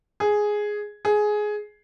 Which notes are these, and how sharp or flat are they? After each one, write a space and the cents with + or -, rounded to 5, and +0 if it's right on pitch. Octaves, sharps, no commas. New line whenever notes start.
G#4 +5
G#4 +15